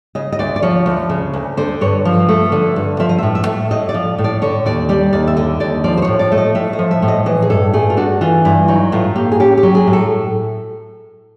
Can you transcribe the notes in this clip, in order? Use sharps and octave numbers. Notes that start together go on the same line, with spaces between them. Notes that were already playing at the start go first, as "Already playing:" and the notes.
C#3 D#5
D#5
D2 D5
D5
F3 C#5
D2
C#3
D2
D3 C5
G2 C#5
F3
A3
D3
G2
F3 E5
D#5
A2 E5
E5
A3
A2 D#5
D5
F3
A2
D5
D3 C#5
D#2 D5
G3 D5
D#2 D5
E5
D3 D#5
D#2 D5
F3 D5
C5
C#5
A2
D5
A3
D#5
A2 E5
D#5
F3
E5
A2
D#5
E3 D#5
G#4
G2 A4
A3 G#4
F4
D4 F#4
E3 F4
G2 E4
F#3 D#4
A2 F4
A#3 G4
G#4
C#4 G4
G4
F#3
G#4
A2
A4